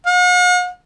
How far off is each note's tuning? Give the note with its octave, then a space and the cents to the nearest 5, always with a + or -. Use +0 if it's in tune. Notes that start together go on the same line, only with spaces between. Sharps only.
F#5 -45